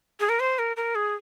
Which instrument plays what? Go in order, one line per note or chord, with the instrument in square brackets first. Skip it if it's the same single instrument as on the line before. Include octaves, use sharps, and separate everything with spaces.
[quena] G#4
A#4
C5
A#4
A#4
G#4